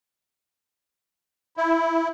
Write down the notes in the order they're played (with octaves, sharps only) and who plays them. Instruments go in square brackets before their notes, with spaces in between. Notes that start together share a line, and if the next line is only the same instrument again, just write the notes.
[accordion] E4